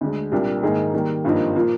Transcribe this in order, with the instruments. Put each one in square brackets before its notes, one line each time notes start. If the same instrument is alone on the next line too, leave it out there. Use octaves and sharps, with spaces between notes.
[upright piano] D2 D3 G#3
C2 A#2 G3 A#3 D4
G#2 D#3 A#3 D#4 G#4
D#3 G3 A#3
G#1 G2 F3 A#3 D#4
A#2 F3 A#3